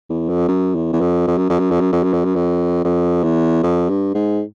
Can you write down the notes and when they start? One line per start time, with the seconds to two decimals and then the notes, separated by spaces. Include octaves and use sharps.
0.10 E2
0.29 F2
0.48 F#2
0.75 E2
0.93 E2
1.01 F2
1.27 F2
1.37 F#2
1.49 F2
1.59 F#2
1.71 F2
1.81 F#2
1.93 F2
2.03 F#2
2.13 F2
2.24 F#2
2.36 F2
2.84 F2
3.24 E2
3.63 F2
3.89 G2
4.14 G#2